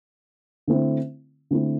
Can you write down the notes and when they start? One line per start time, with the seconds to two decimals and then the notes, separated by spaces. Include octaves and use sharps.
0.67 D3 A3 C4 E4
1.51 D3 A3 C4 E4